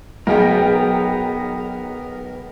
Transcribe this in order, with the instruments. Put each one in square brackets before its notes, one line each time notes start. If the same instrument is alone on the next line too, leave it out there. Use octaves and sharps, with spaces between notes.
[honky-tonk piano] B1 G#4 G5 [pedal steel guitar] B3 A#4